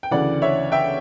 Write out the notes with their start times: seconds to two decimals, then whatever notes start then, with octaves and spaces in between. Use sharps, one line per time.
0.03 G5
0.11 D2 C#3 E3 D5 F#5
0.42 C#5 E5
0.72 E5 G5